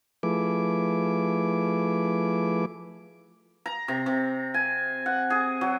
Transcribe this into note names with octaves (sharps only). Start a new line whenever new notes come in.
F3 A3 E4 G#4 B4 D6
A#5
C3
C3
G#5
F#5
G#4
F#3